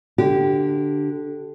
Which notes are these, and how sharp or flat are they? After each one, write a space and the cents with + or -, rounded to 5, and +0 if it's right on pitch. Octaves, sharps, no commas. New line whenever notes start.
D3 +0 G4 -20